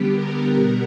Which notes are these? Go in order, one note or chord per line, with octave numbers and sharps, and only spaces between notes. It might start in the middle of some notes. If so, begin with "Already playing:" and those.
Already playing: D3 G3 B3 G4
A#4
B2 G3 B3 A#4